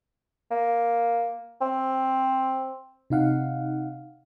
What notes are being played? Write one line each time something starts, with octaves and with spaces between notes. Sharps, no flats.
A#3
C4
C3 D#4 F5 F#5